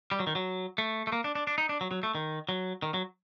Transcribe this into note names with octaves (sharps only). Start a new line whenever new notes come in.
G3
F#3
D#3
F#3
A3
A3
A#3
D4
D4
D4
D#4
D4
F#3
F#3
A3
D#3
F#3
D#3
F#3